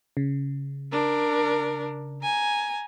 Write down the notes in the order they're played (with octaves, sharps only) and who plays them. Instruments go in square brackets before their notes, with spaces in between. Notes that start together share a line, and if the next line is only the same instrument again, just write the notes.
[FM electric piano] C#3
[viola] D4 A#4
G#5 A#5